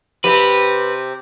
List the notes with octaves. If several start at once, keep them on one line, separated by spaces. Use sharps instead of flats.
C3 C4 G4 B4